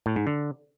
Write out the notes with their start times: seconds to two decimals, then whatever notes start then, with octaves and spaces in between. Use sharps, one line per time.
0.06 A2
0.16 G#2
0.27 D3